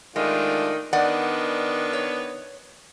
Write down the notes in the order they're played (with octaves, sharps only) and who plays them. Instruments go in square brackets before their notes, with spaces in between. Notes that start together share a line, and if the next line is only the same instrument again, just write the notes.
[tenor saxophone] D#3 [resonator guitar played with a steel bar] G#3 [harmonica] A3 D4 F4
[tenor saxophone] D#3 [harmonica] B3 D4 [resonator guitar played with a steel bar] D5 F#5
[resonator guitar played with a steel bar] C#5